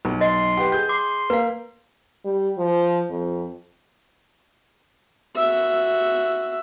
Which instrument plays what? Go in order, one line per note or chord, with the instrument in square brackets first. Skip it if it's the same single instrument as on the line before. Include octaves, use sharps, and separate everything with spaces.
[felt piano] B1
[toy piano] D#5 [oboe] C6
[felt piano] G4 B4 G5 [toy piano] F#5
[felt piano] G#4 G6
[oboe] C6 [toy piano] D6
[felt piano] A#3 [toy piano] B4 F5
[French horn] G3
F3
F2
[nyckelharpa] F#4 E5